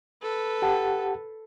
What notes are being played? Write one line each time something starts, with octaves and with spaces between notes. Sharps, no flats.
A4 B4
G4 F#5 A5